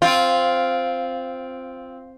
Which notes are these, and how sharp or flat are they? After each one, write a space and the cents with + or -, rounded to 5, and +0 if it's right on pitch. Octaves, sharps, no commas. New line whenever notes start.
C4 +0 F4 +0